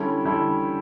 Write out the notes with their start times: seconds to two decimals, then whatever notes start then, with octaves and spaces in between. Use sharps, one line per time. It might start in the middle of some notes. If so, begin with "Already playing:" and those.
Already playing: D3 G3 C#4 E4 A4
0.25 D3 G3 C#4 E4 A4